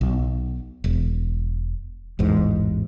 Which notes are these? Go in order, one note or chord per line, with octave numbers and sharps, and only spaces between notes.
B1
E1
A1 E2 G#2